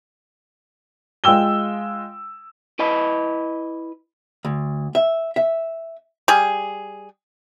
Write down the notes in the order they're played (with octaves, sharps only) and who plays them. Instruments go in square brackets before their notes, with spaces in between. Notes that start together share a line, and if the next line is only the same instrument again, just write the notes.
[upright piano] G#3 F4 G5 E6 G7
[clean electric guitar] E4 B4 D#5 A5 B5
[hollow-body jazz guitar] D2
E5
E5
[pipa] G3 G#4